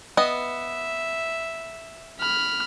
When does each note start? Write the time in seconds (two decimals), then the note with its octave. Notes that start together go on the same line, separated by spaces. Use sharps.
0.17 B3 D#5 E5
2.19 B5 F6